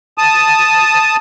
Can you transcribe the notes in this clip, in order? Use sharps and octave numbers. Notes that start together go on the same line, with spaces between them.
A5 D#6